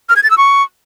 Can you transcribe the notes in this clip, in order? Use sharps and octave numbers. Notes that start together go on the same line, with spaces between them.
F6
G#6
A6
E6
C#6